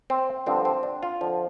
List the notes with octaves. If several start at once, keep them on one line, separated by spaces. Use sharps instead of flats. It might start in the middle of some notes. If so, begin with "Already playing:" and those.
C4
G2 D3 F3 C4
C4
D4
F4
F2 D3 F3